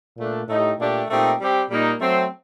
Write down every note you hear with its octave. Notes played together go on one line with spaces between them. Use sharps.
A#2 A3 D4
A2 A3 D#4 G4
A#2 A3 D4 G4
A#2 A3 C4 D#4 G4
G3 C4 G4
A#2 G3 A#3 D#4
F#3 A3 C4